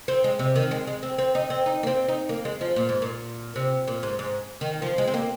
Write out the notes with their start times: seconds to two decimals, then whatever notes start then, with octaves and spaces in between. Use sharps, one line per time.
0.08 C4
0.24 G#3
0.39 C3
0.56 D#3
0.71 G#3
0.87 G#3
1.03 C4
1.18 C4
1.35 D#4
1.50 C4
1.66 D#4
1.83 A#3
1.87 C4
2.08 D#4
2.29 A#3
2.45 G#3
2.61 F3
2.76 A#2
2.89 G#2
3.02 A#2
3.56 C3
3.87 A#2
4.03 G#2
4.19 G#2
4.61 D#3
4.82 F3
4.98 G#3
5.07 C4
5.14 A#3